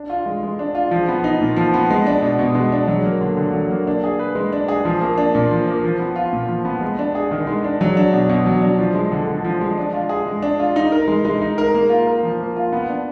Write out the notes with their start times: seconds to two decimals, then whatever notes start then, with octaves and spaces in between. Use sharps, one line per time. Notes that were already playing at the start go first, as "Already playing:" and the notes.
Already playing: D4
0.10 F4
0.26 G#3
0.43 G#3
0.59 D4
0.75 F4
0.91 F3
1.08 B3
1.24 D#4
1.41 A#2
1.56 F3
1.74 B3
1.90 G#3
2.07 D4
2.22 B2
2.39 B2
2.55 G#3
2.72 D4
2.88 F#3
3.04 A#3
3.21 D3
3.37 D3
3.53 F#3
3.71 A#3
3.87 D4
4.04 G#4
4.19 B4
4.35 G#3
4.53 D4
4.69 G#4
4.85 F3
5.01 A#3
5.18 D4
5.35 A#2
5.51 F3
5.67 A#3
5.84 F3
5.99 B3
6.16 F4
6.33 A#2
6.48 F3
6.65 B3
6.81 G#3
6.99 D4
7.15 G#4
7.31 D#3
7.47 G#3
7.64 D4
7.81 F#3
7.97 D4
8.13 B2
8.29 B2
8.46 F#3
8.62 D4
8.79 F3
8.95 G#3
9.12 D3
9.27 D3
9.45 F3
9.61 G#3
9.78 D4
9.93 F4
10.09 G#4
10.27 G#3
10.42 D4
10.60 F4
10.76 D#4
10.92 A#4
11.08 G#3
11.25 G#3
11.42 D#4
11.58 A#4
11.74 A#3
11.90 F4
12.07 A#4
12.23 F3
12.40 A#3
12.56 F4
12.72 B3
12.89 D4